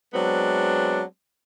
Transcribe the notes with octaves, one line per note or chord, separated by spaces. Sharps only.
F#3 G#3 B3 C4 D4